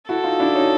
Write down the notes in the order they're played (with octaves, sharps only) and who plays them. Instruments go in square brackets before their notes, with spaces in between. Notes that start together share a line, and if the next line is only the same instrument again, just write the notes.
[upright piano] E4 F#4 [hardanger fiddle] A4
[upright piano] D#4 F4
D4 E4
C#4 D#4